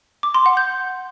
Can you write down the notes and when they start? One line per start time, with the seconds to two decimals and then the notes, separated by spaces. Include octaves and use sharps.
0.23 D6
0.34 C6
0.46 F#5
0.57 G6